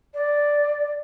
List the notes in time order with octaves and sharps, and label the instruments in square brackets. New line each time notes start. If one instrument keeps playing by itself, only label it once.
[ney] D5